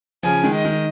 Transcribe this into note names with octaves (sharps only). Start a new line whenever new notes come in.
C#3 F3 G#5
D#3 G#3
D#5
D#3 G#3